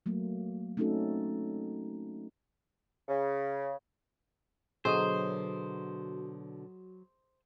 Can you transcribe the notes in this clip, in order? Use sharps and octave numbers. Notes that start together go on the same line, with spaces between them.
F#3 A3 A#3
A3 C4 C#4 D#4 F#4 A4
C#3
B2 D3 F#3 G#4 C5 D#5 D#6